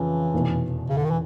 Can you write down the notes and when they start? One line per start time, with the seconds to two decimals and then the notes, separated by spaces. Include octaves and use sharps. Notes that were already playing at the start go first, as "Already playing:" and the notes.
Already playing: F2 C#3 E3 F3 C#4
0.34 F1 E2 B2
0.90 C#3
0.97 D3
1.04 D#3
1.11 E3